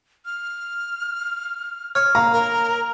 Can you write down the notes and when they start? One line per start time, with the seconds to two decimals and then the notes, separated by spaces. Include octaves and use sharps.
0.25 F6
1.95 C#5 G#5 F6
2.15 A#3 A#5
2.33 A#4